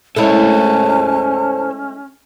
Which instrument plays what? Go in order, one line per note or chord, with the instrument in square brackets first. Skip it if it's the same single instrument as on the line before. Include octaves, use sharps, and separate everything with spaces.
[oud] G#3 A3 E4 [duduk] C#4 [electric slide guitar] A4 C5 C#5 [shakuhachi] A5